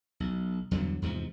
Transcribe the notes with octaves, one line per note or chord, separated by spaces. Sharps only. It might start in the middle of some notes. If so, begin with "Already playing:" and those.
B1
E2 G2 D3 F#3
E2 G#2 C3 F3